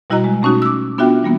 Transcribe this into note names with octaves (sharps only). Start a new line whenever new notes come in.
B2 G3 E4 F#4 D#5 A#5
G#3
B2 A3 C#4 D#4 F#4
D6 E6
B3 D4 F4 F#4 E5 G5
E3 G3 A#3 B3